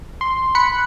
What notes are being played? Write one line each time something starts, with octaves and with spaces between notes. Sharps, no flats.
C6
B5 F#6 C#7